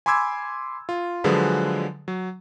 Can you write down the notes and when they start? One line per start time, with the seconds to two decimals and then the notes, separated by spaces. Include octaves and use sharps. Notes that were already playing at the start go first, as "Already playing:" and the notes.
0.06 G#5 B5 C6 D6 E6 G#6
0.89 F4
1.24 D3 F3 F#3 G#3 G#4 B4
2.08 F#3